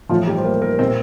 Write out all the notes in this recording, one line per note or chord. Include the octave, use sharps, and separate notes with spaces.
A2 E3 F3 F4
G3 G4
C5
A#3 A#4
A#3 A#4
A#2 C4 C5